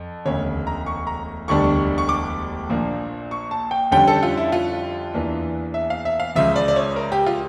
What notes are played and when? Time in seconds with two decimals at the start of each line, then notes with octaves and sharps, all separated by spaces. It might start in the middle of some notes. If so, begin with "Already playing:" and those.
Already playing: F2
0.25 E1 D2 C#3 C#5
0.67 A#5
0.86 C#6
1.07 A#5
1.48 E1 D2 D3 G3 D4 C#6
1.98 C#6
2.09 D6
2.69 A#1 A#2 F3 A#3 D4
3.31 C#6
3.51 A5
3.71 G5
3.91 F2 D3 G3 C#4 G5
4.07 A4
4.23 F4
4.37 E4
4.52 F4
5.14 E2 E3 A#3 D4
5.74 E5
5.90 F5
6.05 E5
6.20 F5
6.35 C#2 C#3 F3 E5
6.56 D5
6.68 D5
6.76 C#5
6.96 A#4
7.12 G4
7.26 F4